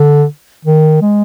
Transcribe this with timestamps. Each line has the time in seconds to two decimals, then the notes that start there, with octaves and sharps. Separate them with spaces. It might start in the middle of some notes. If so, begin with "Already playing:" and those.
Already playing: D3
0.65 D#3
1.02 G#3